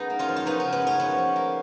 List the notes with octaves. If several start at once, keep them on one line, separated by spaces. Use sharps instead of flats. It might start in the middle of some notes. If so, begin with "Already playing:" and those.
Already playing: F#2 B3 D#4 G#4
A#3
C#4 F4
F3
F4
F#2 B3 D#4
C#3 C#4
B3
A#3 C#4
F3 B3
F3
A#3